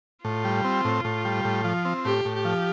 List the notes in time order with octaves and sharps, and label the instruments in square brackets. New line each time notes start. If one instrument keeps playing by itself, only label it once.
[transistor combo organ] A2 [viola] F4
[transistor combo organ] G3
C4
A2
A2
G3
A2
F3
C4
[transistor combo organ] A2 [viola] G4
[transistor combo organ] A2
[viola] G4
[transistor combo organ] F3